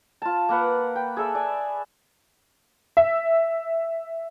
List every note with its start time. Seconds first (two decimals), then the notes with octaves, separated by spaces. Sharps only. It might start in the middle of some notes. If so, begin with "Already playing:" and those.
0.22 F4 A5
0.49 A#3 A#4 B4 F#5
0.96 G5
1.17 G#4 A4 E5 B5
1.35 D5 G#5
2.97 E5